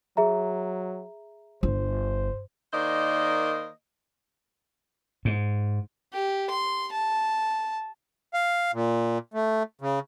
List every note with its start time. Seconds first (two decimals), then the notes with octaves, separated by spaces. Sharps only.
0.17 F#3 G#4 E5 A#5
1.63 G1 C5
2.73 D#3 A#3 C5 D5 D#5
5.25 G#2
6.13 G4
6.50 C6
6.92 A5
8.34 F5
8.74 A#2
9.34 A3
9.81 C#3